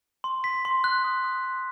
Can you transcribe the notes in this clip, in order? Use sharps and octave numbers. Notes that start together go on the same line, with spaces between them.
C6
B6
C6
F#6
D#6
D#6
C6